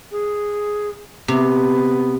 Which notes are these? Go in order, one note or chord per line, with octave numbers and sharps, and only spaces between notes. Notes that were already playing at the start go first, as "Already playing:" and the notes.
G#4
C3 B3